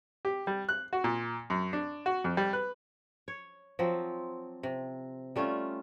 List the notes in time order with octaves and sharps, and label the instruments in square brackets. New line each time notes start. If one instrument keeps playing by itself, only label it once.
[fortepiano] G4
G3
F#6
F#4
A#2
F#2
D4
F#4
F2
G3
B4
[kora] C#5
F3 F#3 C4
C3
G3 A3 C#4 F4